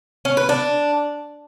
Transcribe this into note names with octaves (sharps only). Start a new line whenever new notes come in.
C#4
B4
D4